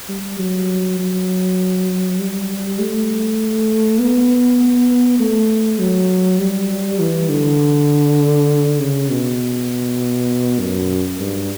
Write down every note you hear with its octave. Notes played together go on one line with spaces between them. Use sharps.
G3
F#3
F#3
G3
A3
B3
A3
F#3
G3
E3
D3
C#3
B2
F#2
G2